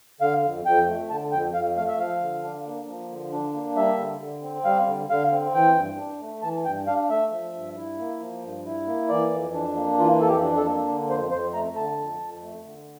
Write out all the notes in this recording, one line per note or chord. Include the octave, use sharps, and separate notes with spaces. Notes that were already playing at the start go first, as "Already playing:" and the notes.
D3 F5
F2
F2 G5
A3
D3 A5
F2 G5
F2 F5
A3 F5
E5
F3 F5
D3
D4
A#3
F3
D3
D4
A#3
G3 E5
D3
D3
C4
G3 F5
D3
D3 F5
C4
E3 G5
G2
D4
A3
E3 A5
G2 G5
D4 F5
A3 E5
F3
G2
E4
A#3
F3
G2
E4
A#3
E3 D5
F2
D4
A#3
E3 F4
F2 A4
G4
D4
A4
A#3
D3
F2 C5
F2 C5
A3 A#5
D3 A5
F2
F2
A3
D3